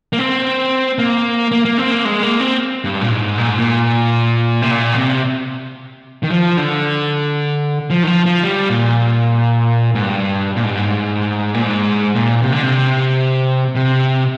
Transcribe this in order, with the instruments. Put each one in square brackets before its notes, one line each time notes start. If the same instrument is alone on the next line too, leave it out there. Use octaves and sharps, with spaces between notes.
[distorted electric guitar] A#3
C4
A#3
A#3
A#3
C4
A#3
G#3
A#3
C4
G2
A#2
G#2
A#2
G#2
A#2
C3
A#2
D3
C3
D#3
F3
D3
F3
D#3
F3
F3
G3
A#2
G#2
G2
A#2
G#2
G2
G#2
A#2
G#2
A#2
C3
D3
C3
C3